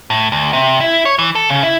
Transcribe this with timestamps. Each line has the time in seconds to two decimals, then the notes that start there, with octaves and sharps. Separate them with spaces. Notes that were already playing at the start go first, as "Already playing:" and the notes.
0.10 A2
0.32 D2
0.53 C3
0.80 E4
1.05 C#5
1.19 E3
1.35 A4
1.49 C#3
1.63 E4